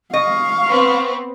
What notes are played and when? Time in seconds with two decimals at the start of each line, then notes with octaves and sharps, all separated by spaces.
0.14 D#5 F5 C#6
0.68 B3 C4